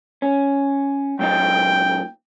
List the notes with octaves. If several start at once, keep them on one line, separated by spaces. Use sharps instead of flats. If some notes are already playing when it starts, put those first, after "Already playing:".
C#4
F#2 A#2 D#4 G5